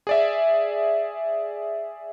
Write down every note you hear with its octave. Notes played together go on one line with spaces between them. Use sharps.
G#4 D5 E5